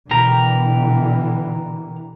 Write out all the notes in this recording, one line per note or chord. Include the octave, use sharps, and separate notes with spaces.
B2 D3 E3 G4 A#4 A#5